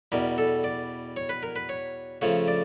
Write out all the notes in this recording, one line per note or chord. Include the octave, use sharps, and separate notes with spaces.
E2 B2 G3 A#4
A4
D5
C#5
B4
A#4
B4
C#5
C#3 F3 A3 C#5
D5